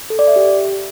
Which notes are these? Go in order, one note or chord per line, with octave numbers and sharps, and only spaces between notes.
A4
D5
E5
G4